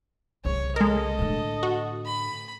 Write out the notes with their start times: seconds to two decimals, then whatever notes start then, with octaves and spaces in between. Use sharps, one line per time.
0.45 C2 C#3 C#5
0.76 G#3 A4 A#4 D#5
1.19 A2 D3
1.63 F#4
2.06 B5